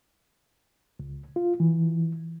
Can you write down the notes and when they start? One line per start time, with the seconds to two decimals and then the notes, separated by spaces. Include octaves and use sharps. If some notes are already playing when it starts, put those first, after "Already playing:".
0.99 C#2
1.36 F4
1.60 E3